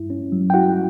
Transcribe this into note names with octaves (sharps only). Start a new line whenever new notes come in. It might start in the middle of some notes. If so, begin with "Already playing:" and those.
Already playing: G2 E4
C#4
F#3
G5
E4 F#4 F#5